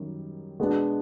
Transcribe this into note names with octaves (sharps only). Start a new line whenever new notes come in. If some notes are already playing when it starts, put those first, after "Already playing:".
Already playing: F#2 D#3 G3
B2 G#3 B3 D4